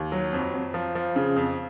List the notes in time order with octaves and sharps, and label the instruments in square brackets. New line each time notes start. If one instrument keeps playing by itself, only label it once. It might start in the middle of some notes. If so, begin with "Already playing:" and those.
Already playing: [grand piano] D#2
F#3
F2
F2
F3
F3
C#3
F2